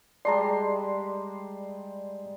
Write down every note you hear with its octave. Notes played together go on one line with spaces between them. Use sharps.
G3 G#3 D5 A5 A#5 C6